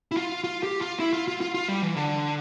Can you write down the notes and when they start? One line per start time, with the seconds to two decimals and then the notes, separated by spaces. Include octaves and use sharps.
0.12 E4
0.17 F4
0.44 F4
0.63 G4
0.81 F4
1.00 E4
1.13 F4
1.28 F4
1.41 F4
1.54 F4
1.69 G3
1.82 E3
1.96 D3